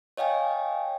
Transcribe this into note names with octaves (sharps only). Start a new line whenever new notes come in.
C#5 D#5 F5 G5 G#5